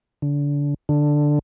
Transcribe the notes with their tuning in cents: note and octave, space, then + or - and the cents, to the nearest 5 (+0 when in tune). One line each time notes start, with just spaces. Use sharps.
D3 -30
D3 +5